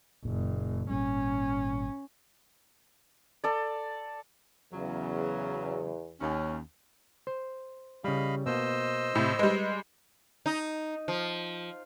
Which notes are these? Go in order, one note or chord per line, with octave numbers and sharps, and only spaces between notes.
F#1 A#2
G#1 A#2 G3 C#4
A4 D5
E2 C#3 F#3
D#2 C#4
C5
C#3 G3 D#5 F5 B5
B2 A#3 C5 D#5 E6
A2 C3 E5
G3 G#3 B4
D#4
F3